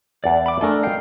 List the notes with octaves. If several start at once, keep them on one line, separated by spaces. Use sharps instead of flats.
E2 D5 F#5
B5 D6
A3 D4 A4 A#4 G#5
D#5 F5 G5